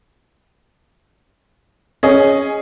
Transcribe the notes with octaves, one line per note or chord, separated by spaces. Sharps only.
C#4 G#4 D#5